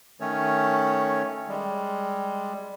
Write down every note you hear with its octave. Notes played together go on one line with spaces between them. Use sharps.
D#3 A3 C#4 C#5
G3 G#3